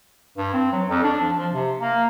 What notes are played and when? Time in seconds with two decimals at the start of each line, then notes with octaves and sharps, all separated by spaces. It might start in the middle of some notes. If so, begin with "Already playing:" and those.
0.37 G2
0.54 C4
0.72 F#3
0.89 F2
1.03 D4
1.21 F3
1.39 F3
1.53 C3
1.80 A#3